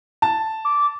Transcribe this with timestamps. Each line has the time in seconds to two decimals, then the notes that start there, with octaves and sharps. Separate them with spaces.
0.22 A5
0.65 D6